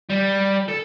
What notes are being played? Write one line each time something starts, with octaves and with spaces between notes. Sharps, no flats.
G3
A4